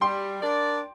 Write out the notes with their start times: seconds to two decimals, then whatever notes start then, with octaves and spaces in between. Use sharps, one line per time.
0.01 G3 G5 C6
0.40 D4 A#4 D5